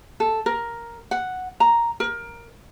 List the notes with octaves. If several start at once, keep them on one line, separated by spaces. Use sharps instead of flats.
A4
A#4
F#5
A#5
A#4